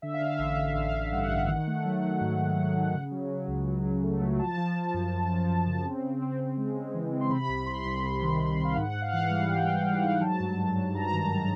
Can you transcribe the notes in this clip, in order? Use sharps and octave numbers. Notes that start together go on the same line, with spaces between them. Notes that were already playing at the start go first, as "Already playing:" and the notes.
D3 E5
F5
D3 E5
A1 E5
D3
A1 F5
A1
G2 F#5
A1
D#3
A3
F#3
F#3
G#2
D#3
F#3
D#3
C#3
F#3
F#3
C#2
F#3
C#2
A3
F#3
F3 A5
F3
F3
F#2
F#2
F3
F#2
C#3
C4
C4
C4
C4
G#3
G#3
E3
C4
C6
C3 B5
C2 B5
C2 C6
C2 B5
C3
D#3
D#3
D#3
F5
G#2 F#5
G#2
F5
E3 F#5
G3
G#2 G5
G#2
G3
G#2
F#3 A5
G2
F#3
G2
G2 A#5
D#3